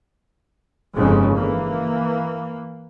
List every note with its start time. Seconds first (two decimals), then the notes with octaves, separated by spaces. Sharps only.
0.94 G1 F2 G#2 C#3 G#3
1.34 E3 A#3